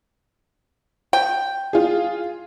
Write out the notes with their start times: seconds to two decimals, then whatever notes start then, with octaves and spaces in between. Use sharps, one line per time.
1.13 G5
1.73 F4 G#4